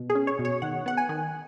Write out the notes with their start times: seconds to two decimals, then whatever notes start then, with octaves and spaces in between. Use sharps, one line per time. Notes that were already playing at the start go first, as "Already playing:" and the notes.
Already playing: B2
0.10 G#4
0.15 C#4
0.27 C#5
0.39 B2
0.45 C#5
0.62 D#3 F#5
0.86 B3 F#5
0.97 G#5
1.09 D#3